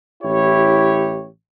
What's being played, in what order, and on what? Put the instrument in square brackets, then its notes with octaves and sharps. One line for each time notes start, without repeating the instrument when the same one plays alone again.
[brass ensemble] A1 E4 G4 C#5